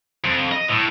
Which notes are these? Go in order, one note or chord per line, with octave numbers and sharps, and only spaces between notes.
F2
D#5
A2